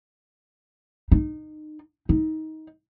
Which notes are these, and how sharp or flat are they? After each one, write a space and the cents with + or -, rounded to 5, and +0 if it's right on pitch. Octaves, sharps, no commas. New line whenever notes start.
D#4 -25
D#4 +20